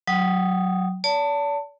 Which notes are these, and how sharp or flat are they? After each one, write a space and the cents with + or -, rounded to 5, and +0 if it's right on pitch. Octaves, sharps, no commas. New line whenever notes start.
F#3 +0 G5 -25 D#6 +0
D5 -45 A5 +20